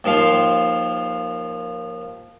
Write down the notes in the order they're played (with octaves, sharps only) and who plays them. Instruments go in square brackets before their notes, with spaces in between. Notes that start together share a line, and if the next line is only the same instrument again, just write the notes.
[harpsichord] D#2 D#3 F3 F5 C6